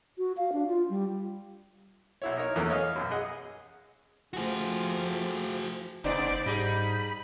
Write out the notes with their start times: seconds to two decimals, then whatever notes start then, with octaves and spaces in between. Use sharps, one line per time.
0.18 F#4
0.37 F5
0.53 D4
0.68 F4
0.89 G3
2.22 B1 E4 C#5
2.37 D#4 A#4 C#5
2.56 E2 E3 A3 A#3 C#4
2.70 C#5 D#5 F5 G#5
2.96 B1 F#2
3.11 G#4 D#5 F#5
4.33 F3 A3 F#4 G#4
6.04 F#1 C3 B3 D#4 C5 D5 D7
6.46 G#2 G3 D#4 G#4 B5 A#6 D7